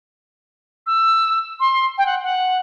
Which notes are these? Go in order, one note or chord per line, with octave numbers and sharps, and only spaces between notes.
E6
C6
G5
F#5
F#5